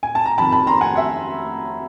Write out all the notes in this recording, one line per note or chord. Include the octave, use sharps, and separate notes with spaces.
G#5
A5
A#5
F2 C3 D#3 A5 B5
A5 B5
A#5 C6
F#5 G#5
E5 F#5